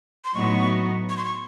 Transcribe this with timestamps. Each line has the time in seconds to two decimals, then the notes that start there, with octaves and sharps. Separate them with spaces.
0.25 C6
0.35 A2 F#3 B3 D#4 F#4 C#6
1.09 C#6
1.17 C6
1.25 C#6